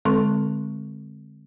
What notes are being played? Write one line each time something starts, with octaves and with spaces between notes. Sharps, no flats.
D3 G#3 C4 A4 C6 C#6